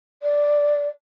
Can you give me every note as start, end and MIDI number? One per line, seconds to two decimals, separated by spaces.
0.23 0.88 74